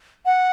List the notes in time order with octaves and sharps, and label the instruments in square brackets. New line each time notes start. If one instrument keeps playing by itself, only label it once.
[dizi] F#5